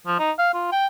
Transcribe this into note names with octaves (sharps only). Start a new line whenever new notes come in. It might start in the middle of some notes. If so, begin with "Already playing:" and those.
F3
D#4
F5
F4
G5